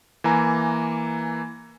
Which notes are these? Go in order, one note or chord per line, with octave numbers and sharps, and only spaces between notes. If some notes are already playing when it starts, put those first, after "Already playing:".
E3 A#3 G#5 A#5